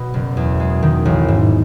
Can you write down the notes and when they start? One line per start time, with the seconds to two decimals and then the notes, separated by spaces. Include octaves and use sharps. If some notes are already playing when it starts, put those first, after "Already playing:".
Already playing: B2
0.14 F#1
0.37 E2
0.60 G#3
0.83 D#3
1.05 A1
1.28 G#2